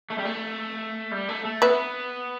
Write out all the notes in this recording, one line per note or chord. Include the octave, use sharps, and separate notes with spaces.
A3
G3
A3
G3
A3
A3
B3 B4 E5